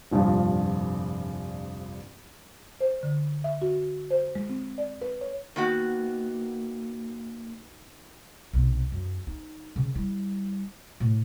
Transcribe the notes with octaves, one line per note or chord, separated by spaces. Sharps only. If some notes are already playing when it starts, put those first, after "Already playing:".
F1 A#1 G2 F3
C5
D3
E5
F#4
C5
G#3
C4
D5
B4
C#5
D#3 A#3 B3 F#4
B1 C3
F#2
D#4
C#3
G3 E4
A2